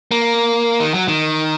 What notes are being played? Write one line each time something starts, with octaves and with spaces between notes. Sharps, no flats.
A#3
D#3
F#3
D#3